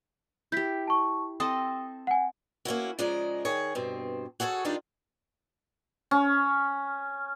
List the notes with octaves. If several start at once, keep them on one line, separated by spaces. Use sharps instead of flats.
E4 G4 G6 B6
A5 C#6
C4 A4 D#5 D#6
F#5 G#5
A#3 C#4 E4 F#4
C#3 F3 G#3 D5 D#5 A#5
D#3 G#4 C#5
G2 B2 C4
F#4 G#4 A4 B4 C#5
D#3 D4 D#4 F4 G4 D5
C#4